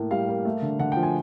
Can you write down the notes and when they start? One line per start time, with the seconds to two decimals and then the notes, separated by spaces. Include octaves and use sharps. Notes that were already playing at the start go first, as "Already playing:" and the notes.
Already playing: A2 A#3
0.11 G3 F5
0.29 A#3
0.45 A3
0.62 D3
0.79 D3 F#5
0.92 G5
0.96 F3
1.03 G#5